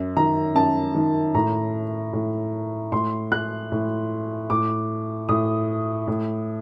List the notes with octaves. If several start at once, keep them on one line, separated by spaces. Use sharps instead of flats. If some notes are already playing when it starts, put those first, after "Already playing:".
Already playing: F#2
D#3 A#5
F#2 A5
D#3
A2 A#5
A2
A2 C6
F#6
A2
A2 D6
A2 D#6
A2